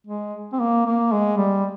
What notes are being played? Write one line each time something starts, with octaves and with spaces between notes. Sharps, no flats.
G#3
C4
A#3
A#3
G#3
G3